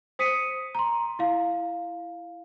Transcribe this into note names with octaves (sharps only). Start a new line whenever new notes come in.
C5 D#6 B6 C#7 D#7
A#5 C6
E4 F5